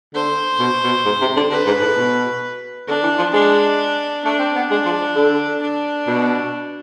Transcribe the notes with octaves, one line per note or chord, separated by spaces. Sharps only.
D3 C5
B2
B2
G#2
C3
D3
D3 B4
G#2
A2
B2
D3 D4
E3
F3
G#3 D4
A3 D4
C4
B3
G#3 D4
F3
D3
D4
B2